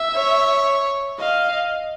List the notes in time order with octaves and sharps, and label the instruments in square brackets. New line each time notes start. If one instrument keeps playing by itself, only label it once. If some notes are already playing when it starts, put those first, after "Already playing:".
Already playing: [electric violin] E5
[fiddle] C#5
[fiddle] D#5 [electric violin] F5